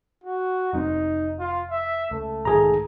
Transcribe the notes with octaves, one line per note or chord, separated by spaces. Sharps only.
F#4
F1 F#3 C4 D#4
F4
E5
C#2 A3
B1 G#2 D#3 G#4 A#5